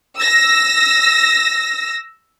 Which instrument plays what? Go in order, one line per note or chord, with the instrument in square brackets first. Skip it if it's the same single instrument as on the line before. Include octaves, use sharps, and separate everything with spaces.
[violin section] E6 A#6